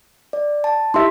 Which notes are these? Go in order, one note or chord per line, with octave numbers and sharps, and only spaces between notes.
D5
A5
D#4 E4 G4 E5 C6